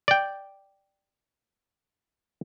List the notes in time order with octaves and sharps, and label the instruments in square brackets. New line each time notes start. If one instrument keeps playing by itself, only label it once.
[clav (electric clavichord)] D5 G5